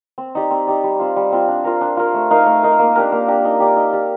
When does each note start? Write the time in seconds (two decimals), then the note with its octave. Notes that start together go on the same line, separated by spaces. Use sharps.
0.18 C4
0.35 D#4 G4 D5
0.51 C4
0.67 D#4 G4 D5
0.84 G3
0.99 C4 F4
1.16 G3
1.32 C4 F4
1.48 D4
1.65 F4 A#4
1.81 D4
1.97 F4 A#4
2.14 A3
2.31 D#4 A#4 F5
2.46 A3
2.63 D#4 A#4 F5
2.79 A#3
2.96 D4 G4 A#4
3.12 A#3
3.28 D4 G4 A#4
3.45 D#4
3.60 G4 D5
3.76 D#4
3.93 G4 D5